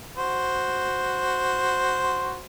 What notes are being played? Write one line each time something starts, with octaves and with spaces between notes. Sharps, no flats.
F#4 C5